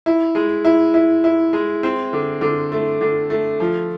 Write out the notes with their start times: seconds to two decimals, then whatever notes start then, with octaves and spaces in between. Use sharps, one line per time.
0.06 E4
0.35 G#3
0.65 E4
0.94 E4
1.24 E4
1.53 G#3
1.83 C4
2.13 D3
2.41 D3
2.72 A3
3.01 D3
3.30 A3
3.60 F3